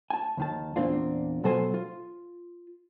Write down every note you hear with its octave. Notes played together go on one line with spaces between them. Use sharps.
G#5 A5
D#2 D#3 A5
E2 A#2 C4 D4 F4
B2 F#3 A4 C5 G#5 C6
F4